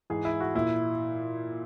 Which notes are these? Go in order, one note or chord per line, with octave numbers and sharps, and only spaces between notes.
G#2 E3 G#4
E4
F#4
A#2 E4